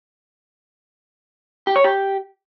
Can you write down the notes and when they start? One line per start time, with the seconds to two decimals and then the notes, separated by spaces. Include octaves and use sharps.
1.67 G4
1.76 C#5
1.84 G4